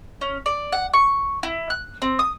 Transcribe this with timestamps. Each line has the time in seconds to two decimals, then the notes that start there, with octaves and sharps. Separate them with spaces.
0.21 C#4
0.46 D5
0.72 F#5
0.94 C#6
1.43 E4
1.70 F#6
2.02 C4
2.19 D#6